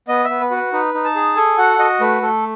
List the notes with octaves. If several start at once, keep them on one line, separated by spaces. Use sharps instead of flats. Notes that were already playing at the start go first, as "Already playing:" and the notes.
B3 D#5
B3 E5
B4
F#4
B4
D#4 B4
D#4
A5
G#4
A4 G#5
F#4 F#5
F#4 D#5
A3 B4
A3 A4